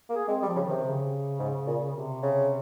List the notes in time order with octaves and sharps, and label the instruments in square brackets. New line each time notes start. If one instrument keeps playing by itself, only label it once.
[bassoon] A#3
[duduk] G#4
[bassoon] G#3 [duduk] C4
[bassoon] G3
[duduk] F3
[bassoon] C#3
[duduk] D#3
[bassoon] C3
[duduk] D#3
C#3
[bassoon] G#2
A#2
[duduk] C3
[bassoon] C#3